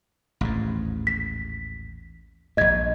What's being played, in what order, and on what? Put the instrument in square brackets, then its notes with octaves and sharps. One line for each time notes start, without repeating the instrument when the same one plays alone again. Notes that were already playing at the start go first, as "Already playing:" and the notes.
[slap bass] A1 D#2 G#2
[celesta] B6
[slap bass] A#1 G2 [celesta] D#5 G#6